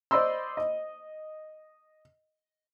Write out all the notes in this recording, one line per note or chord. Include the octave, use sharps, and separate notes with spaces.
C5 D5 D#5 B5 C6 E6
D#5